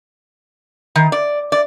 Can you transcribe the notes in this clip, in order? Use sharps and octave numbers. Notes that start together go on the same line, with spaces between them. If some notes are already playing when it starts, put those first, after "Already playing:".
D#3
D5
D5